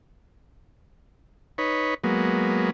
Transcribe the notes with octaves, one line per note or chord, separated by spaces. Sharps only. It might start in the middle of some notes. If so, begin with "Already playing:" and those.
D#4 B4 C#5
F#3 G#3 A#3 B3